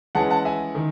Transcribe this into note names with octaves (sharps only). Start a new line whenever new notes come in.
E3 G#3 C#4 F#5 A5
F#5 A5
E5 G#5
D#3